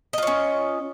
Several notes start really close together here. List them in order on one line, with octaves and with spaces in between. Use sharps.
D#5 F4 C#5 C#4